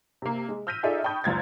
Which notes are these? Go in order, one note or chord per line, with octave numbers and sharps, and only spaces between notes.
C3 A#3
G#3
E6 F6 G6 A#6 B6 D#7
D#4 F4 G#4 A4 D5 E5
G5 A5 B5 C#6 D#6 G6
F#1 C#2 G#6 A6